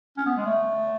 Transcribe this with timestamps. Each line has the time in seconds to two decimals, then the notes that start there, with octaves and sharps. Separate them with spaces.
0.17 C#4
0.26 B3
0.37 G#3
0.46 A3